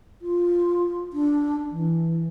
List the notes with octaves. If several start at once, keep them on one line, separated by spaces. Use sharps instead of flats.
F4
D4
E3